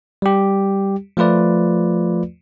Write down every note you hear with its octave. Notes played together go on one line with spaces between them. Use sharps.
G3 G4
F3 A3 F4 B4 D5